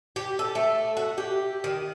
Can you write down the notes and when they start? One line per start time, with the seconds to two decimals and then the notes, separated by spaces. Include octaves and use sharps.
0.16 G4
0.39 A4
0.55 A3
0.97 F#4
1.18 G4
1.64 D#3